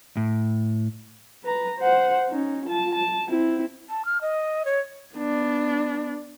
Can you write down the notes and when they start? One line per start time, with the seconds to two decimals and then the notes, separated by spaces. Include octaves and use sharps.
0.17 A2
1.44 B4 A#5
1.79 C5 F#5
2.29 C#4 D#4
2.66 F4 A5
2.95 A5
3.29 C4 E4
3.90 A5
4.05 F6
4.21 D#5
4.65 C#5
5.15 B3 D4